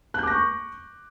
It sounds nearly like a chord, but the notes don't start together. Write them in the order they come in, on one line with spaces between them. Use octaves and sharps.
F#6 G6 D6 A#6 C#6